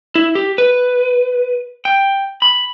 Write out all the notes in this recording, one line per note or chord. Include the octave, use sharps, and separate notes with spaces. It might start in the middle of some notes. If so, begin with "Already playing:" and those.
E4
G4
B4
G5
B5